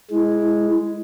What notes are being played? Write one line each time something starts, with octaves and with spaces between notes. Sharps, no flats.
G#3 E4